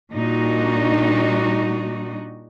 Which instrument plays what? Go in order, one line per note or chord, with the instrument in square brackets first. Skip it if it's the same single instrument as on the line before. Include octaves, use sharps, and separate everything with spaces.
[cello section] A#2 G3 D4 D#4 F#4